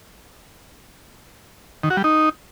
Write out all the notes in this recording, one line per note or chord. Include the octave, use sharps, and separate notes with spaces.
D#3
F#4
G3
D#4